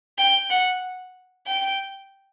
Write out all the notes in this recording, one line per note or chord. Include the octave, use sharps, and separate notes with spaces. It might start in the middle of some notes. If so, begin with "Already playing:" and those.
G5
F#5
G5